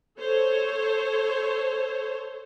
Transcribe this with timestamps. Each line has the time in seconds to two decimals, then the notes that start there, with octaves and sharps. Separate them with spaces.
0.19 A4 C5 C#5